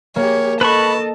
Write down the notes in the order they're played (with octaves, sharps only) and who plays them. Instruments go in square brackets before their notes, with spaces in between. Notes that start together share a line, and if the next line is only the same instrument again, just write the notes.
[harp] A#3 [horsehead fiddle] G4 G#4 [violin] C#5
[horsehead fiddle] A4 D#5 [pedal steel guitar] B4 B5 C#6 [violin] A5